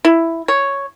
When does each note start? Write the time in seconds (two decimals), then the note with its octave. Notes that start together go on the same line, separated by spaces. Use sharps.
0.05 E4
0.48 C#5